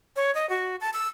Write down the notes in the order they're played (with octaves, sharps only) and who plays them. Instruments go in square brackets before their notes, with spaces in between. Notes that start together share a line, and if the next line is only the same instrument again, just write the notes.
[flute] C#5
D#5
F#4
A5
E6